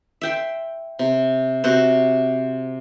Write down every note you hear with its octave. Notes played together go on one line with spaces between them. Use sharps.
E5 G5 C6
C3
C3 F#4 C5